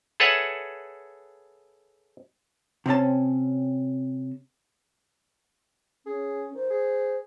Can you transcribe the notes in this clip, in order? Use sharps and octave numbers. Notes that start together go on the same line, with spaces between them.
G#4 A4 B4 C#5 E5 F#5
C3 C4 C#4 A5
C#4 G#4
D#3 C5
G#4